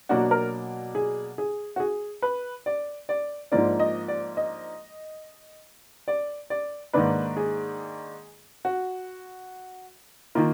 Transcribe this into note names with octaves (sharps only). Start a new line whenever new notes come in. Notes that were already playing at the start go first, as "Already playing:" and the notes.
B2 F#3 A#3 D4 F#4
A#4
G#4
G#4
F#4
G#4
B4
D5
D5
G#2 F3 A#3 D4 D5
D#5
D5
D#5
D5
D5
G#2 D#3 A#3 D4 B4
G#4
F#4
D#3 A#3 F4